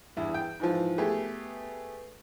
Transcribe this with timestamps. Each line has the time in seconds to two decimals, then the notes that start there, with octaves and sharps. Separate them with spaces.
0.17 E2 G2 E4
0.34 G5
0.60 G#2 E3 F3
0.98 A3 B3 G4 G#4